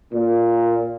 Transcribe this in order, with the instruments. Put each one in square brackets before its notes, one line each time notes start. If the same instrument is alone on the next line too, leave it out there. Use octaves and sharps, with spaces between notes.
[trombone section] A#2